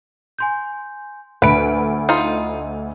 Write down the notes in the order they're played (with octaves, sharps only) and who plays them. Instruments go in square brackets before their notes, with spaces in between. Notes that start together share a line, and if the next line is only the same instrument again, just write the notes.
[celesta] G#5 C6 G6
[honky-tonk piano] D2 D7 [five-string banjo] B4 [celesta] B5
[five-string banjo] D#4 F4